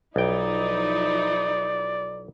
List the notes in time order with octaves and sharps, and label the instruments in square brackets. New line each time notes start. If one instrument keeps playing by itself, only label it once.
[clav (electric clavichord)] B1 G5 [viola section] F3 D#4 E4 [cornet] D5